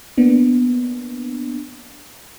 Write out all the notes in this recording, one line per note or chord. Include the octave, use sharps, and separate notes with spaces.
A#3 B3 D4